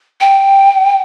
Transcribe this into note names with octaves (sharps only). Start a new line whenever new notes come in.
G5